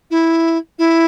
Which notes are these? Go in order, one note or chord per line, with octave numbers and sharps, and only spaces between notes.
E4
E4